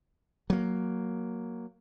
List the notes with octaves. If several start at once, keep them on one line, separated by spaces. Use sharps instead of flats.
F#3 A#3